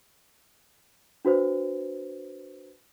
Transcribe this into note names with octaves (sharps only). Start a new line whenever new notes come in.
D4 F#4 B4 C5